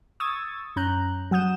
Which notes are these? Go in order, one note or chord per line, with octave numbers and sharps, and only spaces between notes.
C#6 D#6 E6 G#6 A6
F#2 C#4 A#5 F#6 G6
F#3 F#5 D#6 G6 E7